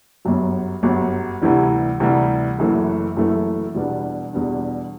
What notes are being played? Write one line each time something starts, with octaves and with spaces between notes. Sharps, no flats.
G1 F#2 F#3
G1 F#2 F#3
D2 C3 E3 G3
D2 C3 E3 G3
F#1 F#2 E3 A3
F#1 F#2 E3 A3
E2 B2 G3 B3 D4
E2 B2 G3 B3 D4